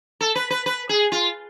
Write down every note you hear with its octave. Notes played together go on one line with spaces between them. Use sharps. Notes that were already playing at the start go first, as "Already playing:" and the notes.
A4
B4
B4
B4
G#4
F4